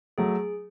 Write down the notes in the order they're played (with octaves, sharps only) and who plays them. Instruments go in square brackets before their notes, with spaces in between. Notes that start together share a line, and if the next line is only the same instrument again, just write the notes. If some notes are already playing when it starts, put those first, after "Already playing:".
[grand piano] F#3 A3 [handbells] G#4